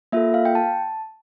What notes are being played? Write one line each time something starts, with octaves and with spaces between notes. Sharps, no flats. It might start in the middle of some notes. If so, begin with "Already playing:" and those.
A#3 F4 A4 E5
F5
G5
A5